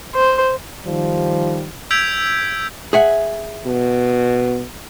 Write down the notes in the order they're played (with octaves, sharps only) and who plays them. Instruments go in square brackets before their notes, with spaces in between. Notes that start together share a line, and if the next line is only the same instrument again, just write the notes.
[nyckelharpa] C5
[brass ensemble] D#3 G3 [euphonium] F3
[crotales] E6 G6 G#6 B6 D7 F7
[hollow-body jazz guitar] G#4 E5 F#5
[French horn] B2